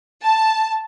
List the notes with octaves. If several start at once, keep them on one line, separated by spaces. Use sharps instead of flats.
A5